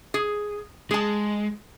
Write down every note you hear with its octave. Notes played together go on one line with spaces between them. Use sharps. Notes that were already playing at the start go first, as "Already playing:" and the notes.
G#4
G#3 G#4 A5